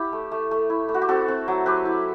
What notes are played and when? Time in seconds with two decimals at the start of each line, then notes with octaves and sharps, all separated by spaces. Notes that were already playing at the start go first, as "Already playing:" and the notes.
Already playing: E4 G4
0.13 A3
0.32 A3
0.51 A3
0.70 E4
0.89 A3
0.94 F#4
1.02 G4
1.09 C4 F#4 A4
1.28 C4
1.48 F#3
1.66 F#3 G4 B4
1.85 E4